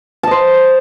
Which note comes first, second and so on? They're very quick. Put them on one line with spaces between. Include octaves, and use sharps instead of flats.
A5 D#5 C5